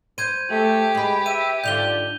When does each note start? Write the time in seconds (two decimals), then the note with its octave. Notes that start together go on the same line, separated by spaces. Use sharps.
0.18 C5 G6 G#6 D#7
0.51 A3 G4
0.95 G#3 G#4 B4
1.26 E5 D#7
1.64 G#2 D3 F4 D5 G6 F7 G7